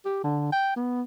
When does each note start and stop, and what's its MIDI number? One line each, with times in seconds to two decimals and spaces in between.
0.05 0.23 67
0.24 0.50 50
0.52 0.72 79
0.76 1.03 59